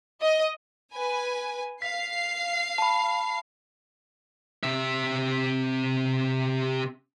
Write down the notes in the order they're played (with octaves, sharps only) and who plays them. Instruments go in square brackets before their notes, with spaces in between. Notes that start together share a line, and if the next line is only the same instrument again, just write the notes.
[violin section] D#5
B4 G#5
[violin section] F5 C7 [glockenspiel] B6
[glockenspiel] A5 B5
[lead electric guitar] C3 E5